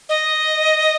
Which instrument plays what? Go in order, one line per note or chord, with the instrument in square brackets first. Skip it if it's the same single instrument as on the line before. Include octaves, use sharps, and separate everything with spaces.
[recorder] D#5